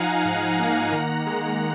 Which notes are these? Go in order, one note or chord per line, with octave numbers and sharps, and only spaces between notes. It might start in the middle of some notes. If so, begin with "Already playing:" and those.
Already playing: F3 D#4 F5 F#5 G#5 A#5
G#2
A#3
D#3 F#5 A#5
G#3